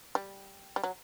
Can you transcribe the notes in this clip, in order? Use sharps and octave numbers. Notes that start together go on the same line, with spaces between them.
G3
G3
F#3